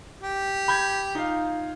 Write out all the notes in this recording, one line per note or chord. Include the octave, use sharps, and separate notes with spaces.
G4
B5 G6 G#6
D#4 F4 F5